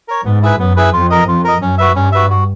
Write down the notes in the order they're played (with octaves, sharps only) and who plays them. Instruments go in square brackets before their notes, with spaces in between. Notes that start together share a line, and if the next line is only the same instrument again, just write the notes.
[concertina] A#4 C#5
[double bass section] G#2 [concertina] B3
[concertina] E4 G#4 B4
[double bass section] F#2 [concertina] B3
[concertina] E4 G#4 B4
[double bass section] F2 [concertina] F4
[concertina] A#4 D#5
[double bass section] F2 [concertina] F4
[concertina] A#4 D#5
[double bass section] F#2 [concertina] C#4
[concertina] F#4 B4 E5
[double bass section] G2 [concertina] C#4
[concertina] F#4 B4 E5
F#4